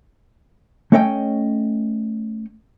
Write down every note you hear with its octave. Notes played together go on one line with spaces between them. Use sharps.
A3 C#4 C#5 D#5 E5 G5